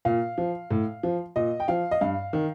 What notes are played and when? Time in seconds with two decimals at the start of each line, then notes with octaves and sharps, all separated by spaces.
0.05 A#2 F5
0.38 F3
0.71 A2
1.03 F3
1.36 A#2 D#5
1.60 G5
1.68 F3 F5
1.91 D#5
2.01 G2 F5
2.33 D#3